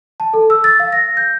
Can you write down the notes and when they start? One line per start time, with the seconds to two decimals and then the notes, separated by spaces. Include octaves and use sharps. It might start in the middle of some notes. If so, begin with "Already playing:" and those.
0.20 A5
0.33 A4
0.50 E6
0.64 A6
0.80 F5
0.93 A#6
1.17 G6